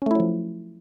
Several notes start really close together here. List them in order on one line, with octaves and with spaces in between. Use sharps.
C#4 A3 E4 F#3 F3